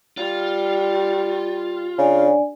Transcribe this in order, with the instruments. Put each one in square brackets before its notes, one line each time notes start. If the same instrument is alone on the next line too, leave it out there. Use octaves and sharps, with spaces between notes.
[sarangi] G3 [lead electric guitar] F4
[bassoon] C#3 [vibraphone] D4 D5 G#5